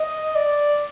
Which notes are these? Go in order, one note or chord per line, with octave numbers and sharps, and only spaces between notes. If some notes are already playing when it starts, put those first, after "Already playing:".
Already playing: D#5
D5